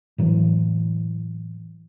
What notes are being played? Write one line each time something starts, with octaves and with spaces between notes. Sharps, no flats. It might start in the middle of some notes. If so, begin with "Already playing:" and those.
A2 E3 F#3